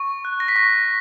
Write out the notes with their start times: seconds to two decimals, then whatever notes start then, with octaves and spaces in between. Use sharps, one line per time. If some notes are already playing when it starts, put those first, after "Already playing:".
Already playing: C#6
0.25 F#6
0.40 A#6
0.48 B6
0.56 C#6 A#6